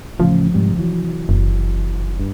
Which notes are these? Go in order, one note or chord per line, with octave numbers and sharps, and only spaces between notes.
A1 C#3 F3
G#2 C3 G3
C3 E3 F#3
F#1
G2